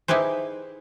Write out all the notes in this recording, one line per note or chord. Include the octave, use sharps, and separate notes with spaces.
D#4 E4 G4 G#4 B4 C5